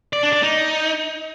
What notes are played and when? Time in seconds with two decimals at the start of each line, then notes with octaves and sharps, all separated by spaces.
0.13 D5
0.23 D4
0.33 D5
0.43 D#4